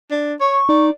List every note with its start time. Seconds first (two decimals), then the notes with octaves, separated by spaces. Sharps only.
0.11 D4
0.40 C#5 C#6
0.69 D#4 D5